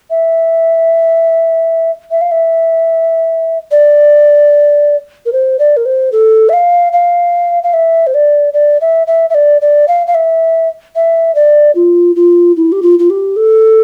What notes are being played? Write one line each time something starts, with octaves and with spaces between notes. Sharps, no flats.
E5
E5
F5
E5
D5
A#4
C5
D5
A#4
C5
A4
E5
F5
F5
F5
E5
C5
D5
D5
E5
E5
E5
D5
D5
F5
F5
E5
E5
D5
F4
F4
E4
G4
F4
F4
G4
A4